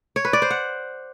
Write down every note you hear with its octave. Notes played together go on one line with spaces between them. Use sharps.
C#5
B4
D5
C5
F#5